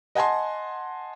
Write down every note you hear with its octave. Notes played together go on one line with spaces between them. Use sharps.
D#5 F#5 G#5 A5 C6